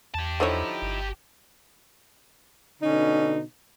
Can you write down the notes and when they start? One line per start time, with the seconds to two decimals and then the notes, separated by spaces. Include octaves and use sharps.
0.15 E2 G4 A5
0.40 D3 F3 D#4 E4 C5 C#5
0.82 G1
2.82 B2 D3 C#4 D#4